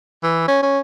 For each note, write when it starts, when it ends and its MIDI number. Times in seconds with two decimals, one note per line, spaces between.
0.23 0.44 52
0.48 0.62 61
0.63 0.79 61